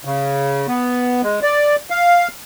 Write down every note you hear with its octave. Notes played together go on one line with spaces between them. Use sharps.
C#3
B3
G#3
D5
F5